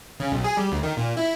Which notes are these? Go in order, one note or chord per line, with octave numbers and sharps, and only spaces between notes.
C#3
B1
G#4
G3
D2
D#3
A#2
E4